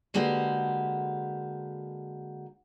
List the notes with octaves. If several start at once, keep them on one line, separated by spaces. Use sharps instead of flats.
D3 G#3 A#3 F#4 G4 B4